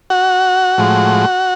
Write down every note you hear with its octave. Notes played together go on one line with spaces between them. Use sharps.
F#4 F#5
A2 F3 G#3